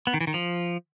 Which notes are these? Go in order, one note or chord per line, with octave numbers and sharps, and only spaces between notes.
B3
D#3
E3
D#3
F3